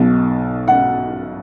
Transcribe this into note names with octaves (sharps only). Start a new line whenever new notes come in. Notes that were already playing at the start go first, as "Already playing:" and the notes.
Already playing: B1 B2
F#5